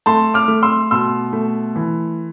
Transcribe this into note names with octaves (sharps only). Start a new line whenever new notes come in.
A3 A5 C6
D6 F6
A3
C6 E6
B2 C6 E6
A3
E3